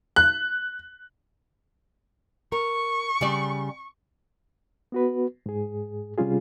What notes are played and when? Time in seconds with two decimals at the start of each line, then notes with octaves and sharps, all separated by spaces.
0.16 F#6
2.52 A#4 C#6
3.21 C#3 G3 D5
4.92 B3 F#4 B4
5.46 G#2 G#4
6.17 C3 G3 C#4 F4 G#4